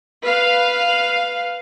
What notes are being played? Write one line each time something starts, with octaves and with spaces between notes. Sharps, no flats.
B4 F5